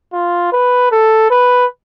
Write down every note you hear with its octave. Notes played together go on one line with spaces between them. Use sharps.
F4
B4
A4
B4